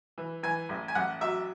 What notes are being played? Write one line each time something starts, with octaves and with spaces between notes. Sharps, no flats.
E3
E3 G#5
A1
G#5
A1 F#5
F#3 E5